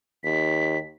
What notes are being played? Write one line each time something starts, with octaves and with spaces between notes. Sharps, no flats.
D#2 B6